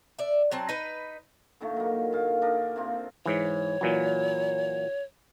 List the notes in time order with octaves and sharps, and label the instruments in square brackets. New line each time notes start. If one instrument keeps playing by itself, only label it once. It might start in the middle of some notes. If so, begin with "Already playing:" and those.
[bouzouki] D5 E5
F#3 C4 A5
D#4 B4
[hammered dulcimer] A#2 D3 D#3 A3
F#3 A#3
A#2 F5
D4 A#4 D#5
C3 A#3 C4 F4
[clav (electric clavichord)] G#2 E3 [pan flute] C#5
[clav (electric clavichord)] A#2 E3 F#3